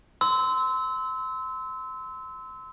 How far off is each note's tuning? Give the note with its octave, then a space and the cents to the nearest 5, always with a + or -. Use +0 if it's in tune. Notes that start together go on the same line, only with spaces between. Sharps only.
C6 -25 E6 -20